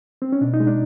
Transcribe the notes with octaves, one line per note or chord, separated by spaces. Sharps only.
C4
C#4
B2 D4
D#4
G#3
D4